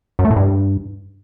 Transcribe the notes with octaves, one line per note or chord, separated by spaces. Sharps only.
F#2
A3
A2
G2